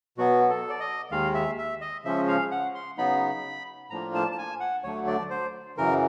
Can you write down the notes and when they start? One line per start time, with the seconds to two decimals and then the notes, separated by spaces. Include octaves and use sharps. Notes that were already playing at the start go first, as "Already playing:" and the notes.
0.18 B2 F#3 B3 F#4
0.49 A4
0.69 D5
0.80 D#5
1.11 D#2 D#3 G#3 F5
1.34 E5
1.58 E5
1.81 D#5
2.04 C#3 F3 G#3 C#4 E5
2.28 F5
2.51 F#5
2.75 C6
2.98 C#3 F#3 B3 D#4 B5
3.90 A2 F3 A#3 D4 F4 A#5
4.15 A5
4.32 A5
4.38 G#5
4.60 F#5
4.84 D2 D3 F#3 A3 D4 C#5
5.07 D5
5.30 C5
5.77 F#2 C#3 E3 A#4